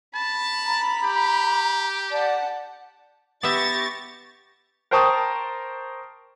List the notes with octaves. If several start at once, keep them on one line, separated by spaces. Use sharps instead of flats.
A5 B5
A#5
G4
D5 F#5 A5
B3 G4 E5 C#6 A6 A#6
A#4 C5 G5 A5 C#6 D#6